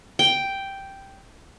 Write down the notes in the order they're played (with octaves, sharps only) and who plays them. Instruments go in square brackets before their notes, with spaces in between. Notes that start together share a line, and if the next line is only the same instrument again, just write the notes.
[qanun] G5